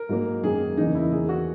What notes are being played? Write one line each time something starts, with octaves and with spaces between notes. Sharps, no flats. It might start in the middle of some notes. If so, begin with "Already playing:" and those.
Already playing: A#4
G#2 F#3 A#3
F#2 D#3 A#3 G#4
E2 C#3 E3 A#3 D#4
E4
E2 D#3 A#3 G#4
F#4